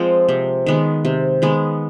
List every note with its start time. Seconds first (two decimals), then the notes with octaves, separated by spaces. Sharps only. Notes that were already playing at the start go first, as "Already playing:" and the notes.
Already playing: F3 G#3 C4
0.29 C3
0.66 D#3 G#3 B3
1.05 C3
1.42 D#3 G#3 B3